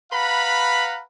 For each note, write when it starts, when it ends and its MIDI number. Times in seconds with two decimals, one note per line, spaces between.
0.12 1.01 71
0.12 1.01 77
0.12 1.01 78
0.12 1.01 82
0.12 1.01 83